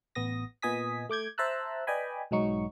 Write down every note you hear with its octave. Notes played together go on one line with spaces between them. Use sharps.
A1 B3 D#6 A#6
A#2 B3 D#5 G#5 D#6 B6
A3 D6 G6 G#6
C5 E5 A5 A#5 E6 F#6
B4 D5 D#5 G5 G#5 B5
B1 G#2 F#3 D#4 C#6